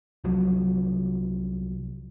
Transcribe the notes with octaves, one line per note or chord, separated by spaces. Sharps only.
C2 F3 F#3